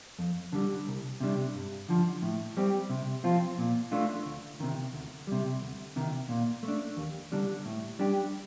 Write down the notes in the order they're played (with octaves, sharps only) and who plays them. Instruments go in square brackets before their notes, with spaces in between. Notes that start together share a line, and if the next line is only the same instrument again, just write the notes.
[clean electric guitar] F2
D3 G3
C2
C3 G3 D4
G2
D3 F3
A2
G3 C4 G4
C3
F3 C4 F4
A#2
A3 D4 F4
D2
C3 D#3
D2
C3 G3
D2
C3 D#3
A#2
A3
D4
D#2
D3 G3 D4
A2
G3 D4 G4